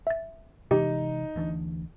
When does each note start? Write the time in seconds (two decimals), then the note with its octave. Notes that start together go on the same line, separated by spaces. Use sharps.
0.07 E5 A6
0.71 C3 E3 G#3 D#4 G4
1.36 D2 E3 D4